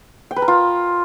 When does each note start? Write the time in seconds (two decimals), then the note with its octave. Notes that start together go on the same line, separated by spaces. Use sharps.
0.31 G5
0.36 B4
0.42 A#4
0.48 F4